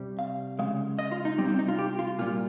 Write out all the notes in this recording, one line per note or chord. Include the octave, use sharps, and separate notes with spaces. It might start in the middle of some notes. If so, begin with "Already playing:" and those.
Already playing: C3 G3
F5
C#3 G#3 F5
D#5
F4
D#4
C3 G3 C4
C4
D#4
F4
G4
F4
A#2 G3 F4